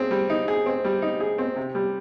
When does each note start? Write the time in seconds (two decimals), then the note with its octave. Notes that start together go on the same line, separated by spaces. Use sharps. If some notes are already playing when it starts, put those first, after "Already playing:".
Already playing: C4 G#4
0.11 G3
0.30 D#4
0.48 G#4
0.66 C4
0.85 G3
1.02 D#4
1.20 G#4
1.38 C4
1.56 C3
1.75 G3